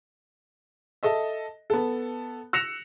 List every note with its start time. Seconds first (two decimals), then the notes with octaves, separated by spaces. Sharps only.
1.03 A4 D#5 E5
1.70 B3 A4
2.53 E6 F#6 A#6 C#7 E7 F7